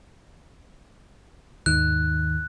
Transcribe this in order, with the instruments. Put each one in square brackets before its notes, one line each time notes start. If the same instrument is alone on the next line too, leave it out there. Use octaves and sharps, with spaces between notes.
[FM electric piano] D#2 G#2 D#3 [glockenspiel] F#6